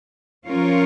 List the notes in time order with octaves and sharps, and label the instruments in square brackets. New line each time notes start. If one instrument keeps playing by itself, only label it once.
[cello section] F3 C#4 F4 A#4 C#5